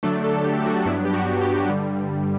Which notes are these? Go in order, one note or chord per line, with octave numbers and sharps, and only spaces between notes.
D3 F#3 A3 D4 A4
A4
G4
F#4
G2 F#3 B3 D4 E4
G4
F#4
G4
G2 D3 G3